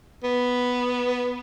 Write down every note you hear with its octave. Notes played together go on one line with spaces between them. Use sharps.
B3